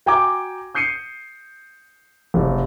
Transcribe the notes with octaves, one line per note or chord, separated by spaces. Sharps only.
F#4 G5 G#5 A#5 D6
D#6 G6 C7 C#7 D#7
F#1 C3